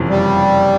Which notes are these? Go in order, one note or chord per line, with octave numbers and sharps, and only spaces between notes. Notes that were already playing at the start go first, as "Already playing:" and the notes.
Already playing: F#1 F2 C3 E3
G3